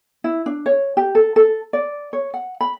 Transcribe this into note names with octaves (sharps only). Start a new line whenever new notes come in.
E4
D4
C#5
G4
A4
A4
D5
C#5
F#5
B5